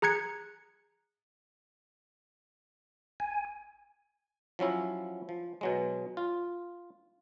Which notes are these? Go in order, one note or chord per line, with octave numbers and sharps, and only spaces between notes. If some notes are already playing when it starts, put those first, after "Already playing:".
G#4 A#5 F#6 G#6 C#7
G#5
F3 F#3 C#4 E4
F3
B2 F#3 G#3
F4